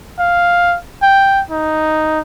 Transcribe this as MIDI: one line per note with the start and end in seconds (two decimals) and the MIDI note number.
0.19 0.77 77
1.02 1.42 79
1.50 2.20 63